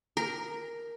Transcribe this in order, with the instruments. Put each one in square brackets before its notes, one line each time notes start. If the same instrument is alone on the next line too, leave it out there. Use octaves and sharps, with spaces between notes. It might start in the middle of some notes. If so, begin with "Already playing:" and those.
[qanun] A#4